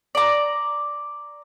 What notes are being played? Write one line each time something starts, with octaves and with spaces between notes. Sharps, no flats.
D5 A#5